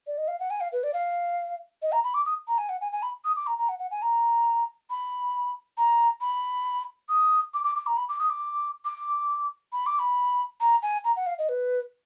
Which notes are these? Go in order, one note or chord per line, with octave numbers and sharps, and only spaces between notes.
D5
D#5
F5
F#5
G#5
F5
B4
D5
F5
D#5
A#5
B5
D6
D#6
A#5
G#5
F#5
G#5
G#5
B5
D#6
D6
A#5
A#5
F#5
F#5
G#5
A#5
B5
A#5
B5
D#6
D6
D6
D6
A#5
B5
D6
D#6
D6
D6
B5
D6
B5
A#5
G#5
A#5
F#5
F5
D#5
B4